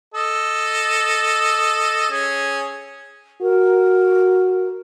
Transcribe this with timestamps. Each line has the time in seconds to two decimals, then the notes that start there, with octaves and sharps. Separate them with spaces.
0.14 A4 D#5
2.11 C#4 G#4
3.42 F#4 A#4